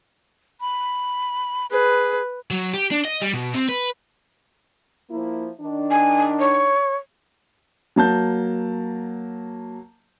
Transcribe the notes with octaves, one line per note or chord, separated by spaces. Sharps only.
B5
G#4 B4
F#3
G4
D4
D#5
G3
B2
C4
B4
F3 A#3 E4
D#3 D4
G#5
C#5
F#3 A#3 A5 G6